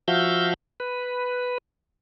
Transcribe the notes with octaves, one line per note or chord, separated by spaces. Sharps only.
F3 F#4 E5 F5 G6
B4